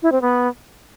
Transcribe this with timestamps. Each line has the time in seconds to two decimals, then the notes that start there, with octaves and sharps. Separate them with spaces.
0.03 E4
0.12 C4
0.22 B3